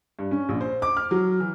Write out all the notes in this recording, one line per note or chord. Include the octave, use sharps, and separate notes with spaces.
G2
C#4
A#1
C5
D6
F6
F#3
E3